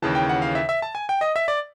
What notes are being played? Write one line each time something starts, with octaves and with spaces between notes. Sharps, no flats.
D#2 C#3 E3 A5
G5
F#5
F5
E5
E5
A5
G#5
G5
D#5
E5
D5